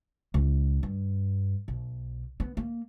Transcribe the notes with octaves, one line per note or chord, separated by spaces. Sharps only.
C#2
G2
B1
B3
A#3